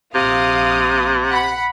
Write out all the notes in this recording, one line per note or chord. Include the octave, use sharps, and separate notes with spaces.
A#1 C3 F5 D#6
F#5 B5